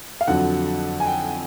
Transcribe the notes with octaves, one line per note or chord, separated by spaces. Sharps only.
F5
F2 D3 F#3 F#5
G#5
G5